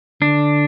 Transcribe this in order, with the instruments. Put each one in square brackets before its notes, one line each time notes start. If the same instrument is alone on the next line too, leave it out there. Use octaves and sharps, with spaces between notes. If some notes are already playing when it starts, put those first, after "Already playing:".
[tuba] D3 [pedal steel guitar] D4